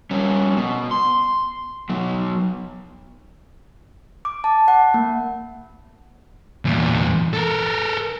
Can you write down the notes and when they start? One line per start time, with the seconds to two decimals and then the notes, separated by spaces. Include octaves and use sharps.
0.11 G2 C#4
0.57 B2
0.91 C6
1.89 B2 F#3
4.25 D6
4.44 A5
4.68 F#5
4.94 A#3
6.65 E2 A#2
7.33 A4 A#4